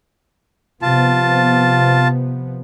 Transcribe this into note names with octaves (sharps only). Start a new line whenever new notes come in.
C3 F3 B3 F4 A5